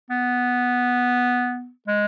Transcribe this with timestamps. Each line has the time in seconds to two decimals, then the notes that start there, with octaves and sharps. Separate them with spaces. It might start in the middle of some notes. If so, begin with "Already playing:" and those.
0.10 B3
1.87 G#3